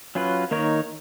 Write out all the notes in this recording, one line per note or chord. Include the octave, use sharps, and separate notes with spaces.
F#3 C#4 F4 B4
D#3 A#3 D#4 A#4 C#5